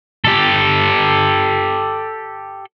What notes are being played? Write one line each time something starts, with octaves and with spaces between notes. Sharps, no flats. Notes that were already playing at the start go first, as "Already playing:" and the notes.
G4 A4